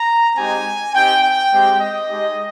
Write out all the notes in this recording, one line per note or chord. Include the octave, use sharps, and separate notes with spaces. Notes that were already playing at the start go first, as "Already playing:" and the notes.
Already playing: A#5
G#3 C4 D#4 G4 G#5
C4 D#4 G4 G5
G5
G#3 C4 G4
D#5
G#3 D#4 G4